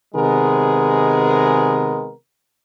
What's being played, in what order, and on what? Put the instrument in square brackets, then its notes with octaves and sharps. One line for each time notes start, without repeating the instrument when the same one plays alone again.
[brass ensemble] C3 D#3 G#3 B3 G#4 A#4